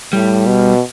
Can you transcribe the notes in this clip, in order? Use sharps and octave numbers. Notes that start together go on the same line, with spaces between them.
A2 G3
B2